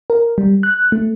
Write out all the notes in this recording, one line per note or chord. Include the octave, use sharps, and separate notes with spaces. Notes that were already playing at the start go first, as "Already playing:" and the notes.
A#4
G3
F#6
A3